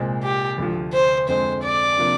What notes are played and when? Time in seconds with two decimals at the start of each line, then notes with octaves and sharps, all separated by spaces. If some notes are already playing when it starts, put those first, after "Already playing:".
Already playing: C2 A#2 G#3 C4
0.23 G4
0.58 D2 D3 F3
0.93 C5
1.28 F2 D3 G#3 C5
1.63 D5
1.98 C3 F3 A#3 D4